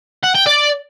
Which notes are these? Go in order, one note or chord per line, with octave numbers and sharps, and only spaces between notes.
F#5
G5
D5